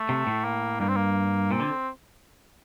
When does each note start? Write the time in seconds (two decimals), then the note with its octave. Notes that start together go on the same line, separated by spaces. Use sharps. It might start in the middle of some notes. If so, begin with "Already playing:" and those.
Already playing: A3
0.09 C3
0.27 A2
0.45 A#3
0.80 G2 A#3
0.88 C4
0.96 A#3
1.51 A#2 C4
1.60 D3